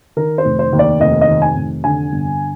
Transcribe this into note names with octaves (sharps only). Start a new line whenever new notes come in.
D#3 A#4
C5
F1
C5
D#2
D5
F1 D#5
D#5
D#3
G#5
F1
D3 G#5
G1